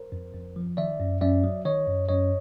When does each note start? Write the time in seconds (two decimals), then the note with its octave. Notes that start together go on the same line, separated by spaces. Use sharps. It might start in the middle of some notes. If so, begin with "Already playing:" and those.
Already playing: A#4 C5
0.12 F2
0.34 F2
0.56 F3
0.77 D#3 D5 E5
1.00 F#2
1.21 F#2 D5 E5
1.44 F#3
1.65 D#3 C#5 D#5
1.87 F#2
2.09 F#2 C#5 D#5